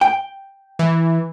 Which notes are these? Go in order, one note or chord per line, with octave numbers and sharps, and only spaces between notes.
G5
E3